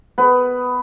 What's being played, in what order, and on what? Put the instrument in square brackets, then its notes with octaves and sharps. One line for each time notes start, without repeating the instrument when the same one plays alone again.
[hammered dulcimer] B3 B4